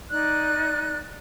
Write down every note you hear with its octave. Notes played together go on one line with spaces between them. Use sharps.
D#4 D5 F#6